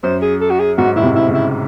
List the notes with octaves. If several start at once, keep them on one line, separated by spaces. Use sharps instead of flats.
F#2 C5
G#4
A4
F#4
G#4
G#2 F#4
A2 E4
G#2 C3
E4
A2 C#3
E4